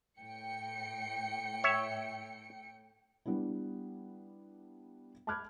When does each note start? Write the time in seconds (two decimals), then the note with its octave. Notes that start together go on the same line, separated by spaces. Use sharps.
0.18 A2 G5 C#7
1.64 C#5 E5
3.26 G3 B3 D4 E4
5.27 A5 B5 D6 F6 F#6 G#6